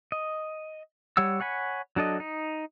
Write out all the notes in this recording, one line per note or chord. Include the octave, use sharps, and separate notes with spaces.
D#5
G3 C#5 F#5 E6
C#5 F#5 G#5 B5
F#3 D4 A4 D#5
D#4